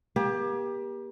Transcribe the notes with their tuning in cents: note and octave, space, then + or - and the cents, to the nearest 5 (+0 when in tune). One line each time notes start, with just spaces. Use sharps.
A#3 +40 G4 +20